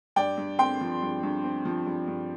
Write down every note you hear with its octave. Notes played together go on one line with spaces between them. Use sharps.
G2 D5 G5
G2
C4 G5 C6
F3
G2
G2
C4
F3
G2
G2